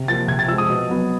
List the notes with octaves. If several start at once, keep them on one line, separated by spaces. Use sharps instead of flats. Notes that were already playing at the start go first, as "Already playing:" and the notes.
Already playing: C3
F3 A#3 A6
C3 G#6
A6
F3 G#3 E6
D#6
B2
F#3 B3